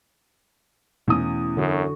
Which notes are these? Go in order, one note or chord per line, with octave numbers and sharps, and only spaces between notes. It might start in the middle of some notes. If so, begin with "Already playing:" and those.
E2 B2 E3 A3 C#4 D#6
F#2 D3 F#4